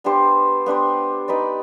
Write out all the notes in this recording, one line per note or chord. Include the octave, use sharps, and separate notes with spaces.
B3 D4 G4 C5
B3 D4 G4 C5
D#4 G4 B4 D5